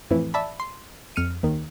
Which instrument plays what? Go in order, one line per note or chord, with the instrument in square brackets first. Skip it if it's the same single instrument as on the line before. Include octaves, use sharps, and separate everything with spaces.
[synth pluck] F2 A2 E3
D5 E5 A5 B5
C6
F2 F6 C#7 D#7
D#2 D#3